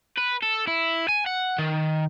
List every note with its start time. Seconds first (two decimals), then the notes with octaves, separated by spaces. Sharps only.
0.17 B4
0.42 A4
0.67 E4
1.08 G#5
1.26 F#5
1.59 D#3